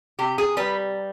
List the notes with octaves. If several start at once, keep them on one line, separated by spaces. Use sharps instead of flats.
C3 G4
G#4
G3 B4